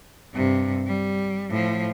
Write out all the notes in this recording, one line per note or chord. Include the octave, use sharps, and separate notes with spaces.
G2 C3
G3
A2 F3